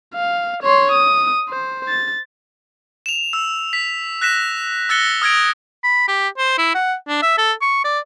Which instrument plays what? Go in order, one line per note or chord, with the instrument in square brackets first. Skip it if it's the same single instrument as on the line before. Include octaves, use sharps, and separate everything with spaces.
[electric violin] F5
C#5 C6
D#6
C5
A6
[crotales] E7 F7
E6
B6
F#6 A#6 B6 E7
E6 F#6 A6 A#6 C#7 G7
D#6 F6 G#6 A#6 D7
[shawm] B5
G4
C5
E4
F#5
D4
E5
A4
C#6
D5